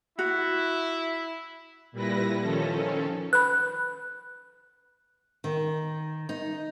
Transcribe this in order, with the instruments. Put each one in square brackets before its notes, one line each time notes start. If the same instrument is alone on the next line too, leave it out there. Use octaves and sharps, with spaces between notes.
[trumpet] E4 [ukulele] F#4
[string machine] A#2 G3 E4 B4 A#6
D#3 F3 C#4 A4
[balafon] B4 B5 [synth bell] F#6
[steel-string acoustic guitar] D#3
D#4